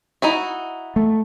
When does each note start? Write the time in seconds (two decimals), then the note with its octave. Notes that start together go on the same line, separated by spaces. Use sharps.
0.22 D#4 E4 F#4
0.96 A3